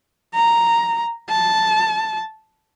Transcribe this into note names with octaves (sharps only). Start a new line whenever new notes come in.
A#5
A5